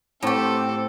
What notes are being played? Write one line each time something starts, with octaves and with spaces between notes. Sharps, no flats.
A2 C4 G4 A4